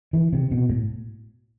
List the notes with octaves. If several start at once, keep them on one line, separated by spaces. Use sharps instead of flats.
E3
C3
B2
A2